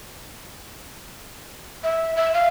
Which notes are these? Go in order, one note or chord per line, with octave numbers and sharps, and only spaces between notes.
E5
E5
F5